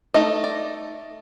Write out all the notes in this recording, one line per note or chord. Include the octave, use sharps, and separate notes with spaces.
A3 D#4 D#5
D5